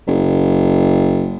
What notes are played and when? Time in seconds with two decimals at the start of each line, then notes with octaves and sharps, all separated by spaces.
0.07 F#1